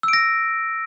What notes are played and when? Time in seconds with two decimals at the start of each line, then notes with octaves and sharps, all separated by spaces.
0.03 E6
0.08 D7
0.13 A#6